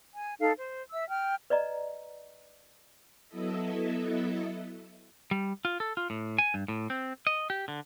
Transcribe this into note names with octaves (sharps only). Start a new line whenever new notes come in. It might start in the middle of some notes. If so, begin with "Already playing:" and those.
G#5
D#4 A4 F5
C5
E5 E6
G5 F6
B4 D5 D#5 A#5
F#3 B3 E4 A4 D#5 E5
G3
F4
A4
F4
A2
G#5
G2
A2
C4
D#5
G4
D3